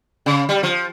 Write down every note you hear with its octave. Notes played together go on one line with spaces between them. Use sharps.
C#3
G3
F3